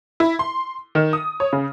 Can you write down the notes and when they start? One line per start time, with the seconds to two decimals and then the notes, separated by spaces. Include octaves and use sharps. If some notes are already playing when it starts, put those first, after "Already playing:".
0.20 E4
0.39 C6
0.95 D#3
1.13 D#6
1.40 C#5
1.53 C#3